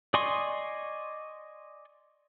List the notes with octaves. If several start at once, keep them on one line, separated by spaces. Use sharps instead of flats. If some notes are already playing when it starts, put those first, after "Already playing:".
D5 D#5 G#5 C6 C#6